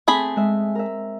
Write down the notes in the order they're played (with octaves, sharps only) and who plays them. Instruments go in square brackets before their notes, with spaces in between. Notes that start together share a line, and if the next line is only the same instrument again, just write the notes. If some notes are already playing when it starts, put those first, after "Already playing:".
[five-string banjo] A3 G#4 B5 [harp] C4
[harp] G#3 E5
A#4 E5